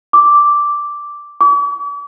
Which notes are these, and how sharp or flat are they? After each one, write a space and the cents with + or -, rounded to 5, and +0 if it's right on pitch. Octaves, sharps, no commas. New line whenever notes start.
D6 -5
D6 -45